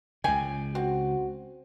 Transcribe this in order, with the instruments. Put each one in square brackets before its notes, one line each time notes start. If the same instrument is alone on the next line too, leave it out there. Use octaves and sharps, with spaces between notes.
[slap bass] C#2 C#3 [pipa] G5 G#5
[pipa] C4 [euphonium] F#4